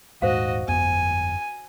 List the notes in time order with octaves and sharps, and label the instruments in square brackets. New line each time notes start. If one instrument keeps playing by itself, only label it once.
[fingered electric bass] D#1 G#2 [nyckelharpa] F#4 D#5 [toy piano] C5 F5
[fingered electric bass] G1 F2 B3 [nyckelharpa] G#5